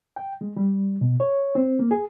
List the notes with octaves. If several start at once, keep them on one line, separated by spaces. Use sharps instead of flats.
G5
G#3
G3
B2
C#5
C4
A#3
G#4